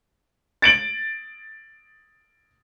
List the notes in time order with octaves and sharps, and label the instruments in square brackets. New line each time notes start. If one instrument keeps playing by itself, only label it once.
[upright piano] A6 D7 F#7